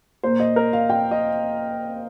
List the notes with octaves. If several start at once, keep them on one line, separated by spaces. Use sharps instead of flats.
A#2 A#3 C5
D#5
A#4
F5
G5
D#5